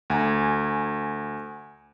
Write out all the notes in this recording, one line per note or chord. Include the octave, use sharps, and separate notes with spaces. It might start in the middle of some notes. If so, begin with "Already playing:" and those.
D2 G#5 A#5